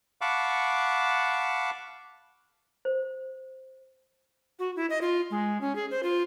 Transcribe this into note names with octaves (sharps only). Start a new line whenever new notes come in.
F5 F#5 A5 B5 C#6 D6
C5
F#4
E4
D#5
F4
G#3
C#4
G#4
C5
F4